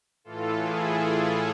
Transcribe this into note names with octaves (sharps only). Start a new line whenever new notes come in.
A2 E3 F4 A4
E4 G#4
F4 A4